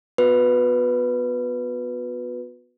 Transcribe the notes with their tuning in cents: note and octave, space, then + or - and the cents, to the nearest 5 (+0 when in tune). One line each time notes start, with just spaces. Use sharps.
B3 +5 F#4 -40 B4 +0